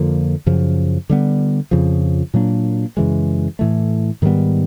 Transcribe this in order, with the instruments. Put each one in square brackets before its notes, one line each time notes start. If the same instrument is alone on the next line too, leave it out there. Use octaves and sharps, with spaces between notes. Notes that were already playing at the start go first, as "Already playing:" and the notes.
Already playing: [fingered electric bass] F2 D3 F3 A#3
F#2 C#3 F3
D3 G3 B3
F2 C#3 F3
A#2 F#3 A#3 D4
F#2 C#3 E3 G#3
A2 E3 A3
G#2 D#3 G3 B3